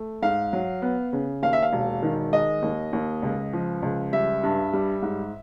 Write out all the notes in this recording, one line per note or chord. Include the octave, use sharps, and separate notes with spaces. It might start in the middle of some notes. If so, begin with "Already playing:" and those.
Already playing: A3
G#2 F5
F#3
B3
C#3
D#2 F5
E5
F5
E1
D#3
G#3 D#5
D#2
D#2
C#2
F3
C#2
G3 E5
G2
G3
G#2